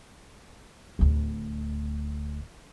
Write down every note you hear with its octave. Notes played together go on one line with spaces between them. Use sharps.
D1 D2